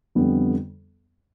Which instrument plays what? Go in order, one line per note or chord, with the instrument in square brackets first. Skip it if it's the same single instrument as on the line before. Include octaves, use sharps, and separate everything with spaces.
[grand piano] F2 D3 G3 B3